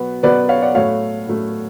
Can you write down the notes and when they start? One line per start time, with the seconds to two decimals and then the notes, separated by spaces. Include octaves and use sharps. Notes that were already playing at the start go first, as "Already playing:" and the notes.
Already playing: B2 F#3 B3 B4
0.23 B2 F#3 B3 B4 D5
0.49 C#5 F5
0.62 D5 F#5
0.74 A2 F#3 A3 C#5 F5
1.27 A2 F#3 A3